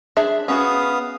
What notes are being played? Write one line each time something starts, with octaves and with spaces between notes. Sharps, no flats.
D4 G#4 E5
B3 C#4 F#4 G#4 F5 D#6